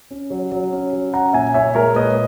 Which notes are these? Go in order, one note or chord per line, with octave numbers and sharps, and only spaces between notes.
C#4
F#3
F#3
C#4
F#3
C#4 F#5 A#5
A#2 E5 G#5
A#2 C#5 E5
G#3 A#4 C#5
A#2 B4 D#5